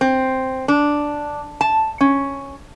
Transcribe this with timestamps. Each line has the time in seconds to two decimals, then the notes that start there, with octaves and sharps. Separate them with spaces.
0.01 C4
0.68 D4
1.61 A5
2.01 C#4